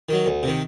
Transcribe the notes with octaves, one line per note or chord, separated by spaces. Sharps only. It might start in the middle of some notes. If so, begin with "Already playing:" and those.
D#3 F#3
D2
C3 D#3